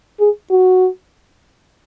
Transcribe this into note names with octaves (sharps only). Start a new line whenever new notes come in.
G#4
F#4